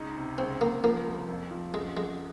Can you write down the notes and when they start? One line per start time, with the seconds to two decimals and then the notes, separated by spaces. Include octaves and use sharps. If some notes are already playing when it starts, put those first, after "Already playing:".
Already playing: C#2 D#4
0.17 C3
0.38 C#2 C4
0.61 C#2 A#3
0.83 F3 A#3
1.06 C2
1.28 F2
1.51 F3
1.74 F#2 G#3
1.97 F#2 G#3